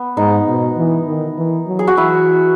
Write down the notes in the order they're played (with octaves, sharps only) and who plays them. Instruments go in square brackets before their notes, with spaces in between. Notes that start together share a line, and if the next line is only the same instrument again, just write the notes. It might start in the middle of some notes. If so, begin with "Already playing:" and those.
Already playing: [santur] B3
[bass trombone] G#2 [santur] D#4
[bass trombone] B2
E3
D#3
E3
F#3
[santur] G#4
F#4
[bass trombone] E3 [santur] E4